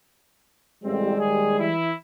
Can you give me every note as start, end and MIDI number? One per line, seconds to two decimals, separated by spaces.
0.84 1.17 33
0.84 1.72 55
0.84 1.72 56
0.84 1.17 60
1.18 1.57 39
1.18 1.57 68
1.60 1.91 52
1.60 1.91 64